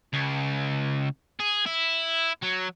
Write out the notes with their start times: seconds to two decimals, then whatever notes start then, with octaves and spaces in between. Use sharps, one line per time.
0.13 C#2
1.40 G#4
1.66 E4
2.42 F#3